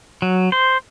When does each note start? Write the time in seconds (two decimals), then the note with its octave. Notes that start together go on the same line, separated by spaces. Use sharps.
0.22 F#3
0.52 C5